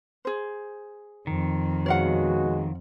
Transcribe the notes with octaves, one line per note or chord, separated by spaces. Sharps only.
G#4 C5
F2 D#3
B2 G#3 F#4 C#5 F5 F#5